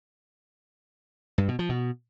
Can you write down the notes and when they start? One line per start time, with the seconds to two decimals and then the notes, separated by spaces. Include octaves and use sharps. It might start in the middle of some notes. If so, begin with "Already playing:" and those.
1.38 G2
1.48 B2
1.59 F3
1.69 B2